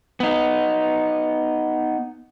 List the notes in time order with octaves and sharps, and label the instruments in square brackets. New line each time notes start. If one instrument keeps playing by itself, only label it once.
[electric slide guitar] B3 D#4